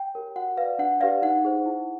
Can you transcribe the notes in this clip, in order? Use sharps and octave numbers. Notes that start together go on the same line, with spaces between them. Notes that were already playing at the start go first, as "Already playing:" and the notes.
Already playing: G5
G4 A#4 C#5
F#4 F#5
B4 D5 F5
D4 F#5
G4 B4 D5 F5
D#4 F#5
G#4 C5
E4